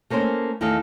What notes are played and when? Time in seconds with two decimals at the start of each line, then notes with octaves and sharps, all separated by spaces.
0.10 A3 A#3 C#4 A#4 C5
0.61 E2 D#3 A3 A4 D#5 F5